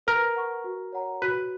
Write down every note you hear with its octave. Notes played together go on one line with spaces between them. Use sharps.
A#4 B4
F#5 C#6
F#4
C#5 F#5 A#5
F#4 B4